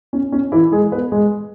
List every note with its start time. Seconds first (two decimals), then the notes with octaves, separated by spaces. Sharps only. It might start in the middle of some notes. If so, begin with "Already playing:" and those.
0.13 C#4
0.32 C#4
0.52 E3 E4
0.72 G#3 G#4
0.92 B3 B4
1.12 G#3 G#4